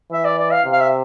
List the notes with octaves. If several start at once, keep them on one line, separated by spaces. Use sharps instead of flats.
E3 E5
D5
D5
F5
C3
F5
E5